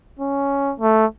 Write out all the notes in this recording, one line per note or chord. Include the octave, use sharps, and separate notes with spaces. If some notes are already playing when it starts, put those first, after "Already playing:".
C#4
A3